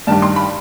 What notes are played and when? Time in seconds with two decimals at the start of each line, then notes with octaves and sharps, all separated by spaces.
0.07 G2 D#3 G3 A5
0.22 C6
0.36 B5